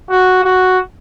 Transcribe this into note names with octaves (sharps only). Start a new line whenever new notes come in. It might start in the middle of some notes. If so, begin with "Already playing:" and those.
F#4
F#4